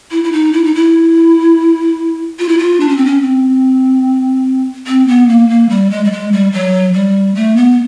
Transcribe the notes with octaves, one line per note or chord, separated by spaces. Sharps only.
E4
E4
D#4
E4
D#4
E4
F4
E4
F4
D4
C#4
C4
C#4
C4
C4
B3
A#3
A#3
G3
G#3
G3
G#3
G3
F#3
G3
A3
B3